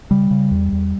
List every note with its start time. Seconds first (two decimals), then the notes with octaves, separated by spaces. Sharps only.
0.11 C#3 G3
0.31 C#3
0.51 E2
0.72 E2